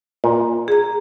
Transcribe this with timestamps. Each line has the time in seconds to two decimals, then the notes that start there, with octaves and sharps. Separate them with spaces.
0.24 A#2
0.68 G#4 A#5